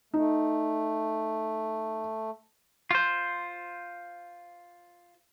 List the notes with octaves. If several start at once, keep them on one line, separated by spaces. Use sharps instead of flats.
A3 D#4
F4 C5